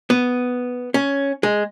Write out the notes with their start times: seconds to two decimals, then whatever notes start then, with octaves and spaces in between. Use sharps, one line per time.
0.10 B3
0.94 C#4
1.43 G#3